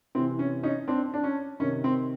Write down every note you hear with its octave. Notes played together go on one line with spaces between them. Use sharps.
C3 E3 C4
C#4
C#4 D#4
C4 D4
D4
C#4
C3 D#3 C#4
C4